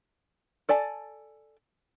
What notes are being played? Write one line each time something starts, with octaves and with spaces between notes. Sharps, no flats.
A4 D5 G#5 A5